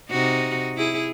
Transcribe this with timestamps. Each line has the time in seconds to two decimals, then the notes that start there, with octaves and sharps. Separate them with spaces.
0.11 C3 D#4 F#4
0.77 E4 G#4